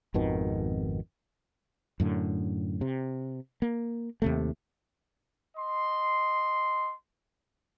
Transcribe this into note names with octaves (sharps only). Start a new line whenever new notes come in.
G#1 F2 B2 D#3
F#2 A2 D3
C3
A#3
D#2 C3 A3
D#5 C6